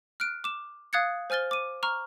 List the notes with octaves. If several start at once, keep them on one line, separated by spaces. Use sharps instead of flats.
F6 F#6 D7
D6 E7
F5 D#6 F#6 G#6 A6 C#7
C5 G#5 F6 A6 G7
D6 D#7
A#5 C#6 F6